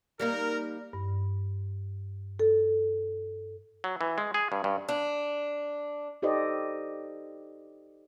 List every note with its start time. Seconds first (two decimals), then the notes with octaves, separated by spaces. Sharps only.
0.20 G3 A#3 D#4 A#4
0.93 G2
2.39 A4
3.84 F#3
4.01 E3
4.18 G#3
4.34 G#4
4.52 G2
4.64 G2
4.89 D4
6.22 D#4 G4 A4 C5 D5 D#5